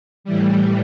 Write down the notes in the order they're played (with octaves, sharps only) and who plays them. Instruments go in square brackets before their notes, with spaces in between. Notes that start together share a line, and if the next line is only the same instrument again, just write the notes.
[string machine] A2 E3 G3